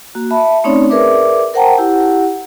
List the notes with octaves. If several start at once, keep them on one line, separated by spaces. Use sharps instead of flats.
A#3 F#4
E5 A5 B5
A3 C4 C#4 D#4 C#5 D5
G#4 A#4 B4 D5 E5 D6
A#4 C5 F#5 G5 A5 A#5
E4 G4 F#5